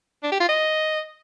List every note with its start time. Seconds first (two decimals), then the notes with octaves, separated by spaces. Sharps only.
0.23 D4
0.32 G4
0.40 F4
0.49 D#5